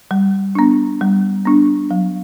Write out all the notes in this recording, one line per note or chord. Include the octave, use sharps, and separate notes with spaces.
G3
B3 D4
G3
B3 D4
F#3